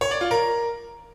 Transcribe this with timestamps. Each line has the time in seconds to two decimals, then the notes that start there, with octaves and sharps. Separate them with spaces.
0.01 C#5
0.11 D5
0.21 F4
0.31 A#4